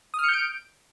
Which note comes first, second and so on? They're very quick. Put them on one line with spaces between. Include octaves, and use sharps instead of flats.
D#6 F6 C#7 G6 D7